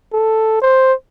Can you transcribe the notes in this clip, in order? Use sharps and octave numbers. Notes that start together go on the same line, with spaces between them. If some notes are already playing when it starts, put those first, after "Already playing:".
A4
C5